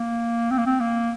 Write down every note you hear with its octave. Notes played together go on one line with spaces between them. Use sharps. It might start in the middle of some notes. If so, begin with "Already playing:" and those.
Already playing: A#3
C4
A#3
C4
A#3